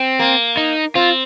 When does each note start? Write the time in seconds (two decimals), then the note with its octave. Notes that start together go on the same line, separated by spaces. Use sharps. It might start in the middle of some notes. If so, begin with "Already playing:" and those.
Already playing: C4
0.19 A#3
0.57 D#4
0.95 C4 F4